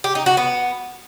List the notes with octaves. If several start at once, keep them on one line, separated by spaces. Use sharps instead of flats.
G4
D#4
F#4
B3